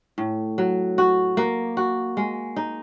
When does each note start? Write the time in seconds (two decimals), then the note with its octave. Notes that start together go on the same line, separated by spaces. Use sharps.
0.18 A2
0.58 F#3
0.98 F#4
1.37 A#3
1.77 F#4
2.17 G#3
2.57 D#4